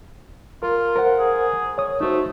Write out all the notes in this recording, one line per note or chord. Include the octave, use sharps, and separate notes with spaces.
F4 A#4
A#4 C5 F#5
G#4
C#5 D#6
A3 D#4 F#4 C5